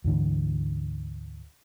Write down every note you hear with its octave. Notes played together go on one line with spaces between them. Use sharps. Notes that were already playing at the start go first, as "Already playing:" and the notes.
D2 G#2 D3 E3